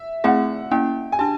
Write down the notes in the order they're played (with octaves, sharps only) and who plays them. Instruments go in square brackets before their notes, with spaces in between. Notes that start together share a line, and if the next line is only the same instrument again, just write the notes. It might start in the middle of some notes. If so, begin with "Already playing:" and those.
Already playing: [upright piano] E5
[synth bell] A3 C4 E4 G#4 [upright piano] F#5
[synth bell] A#3 C#4 E4 [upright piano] G5
[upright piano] G#5
[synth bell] D4 G4 [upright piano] A5